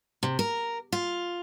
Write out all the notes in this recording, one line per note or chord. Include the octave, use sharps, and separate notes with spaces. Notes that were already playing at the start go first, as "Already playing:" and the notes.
C3
A#4
F4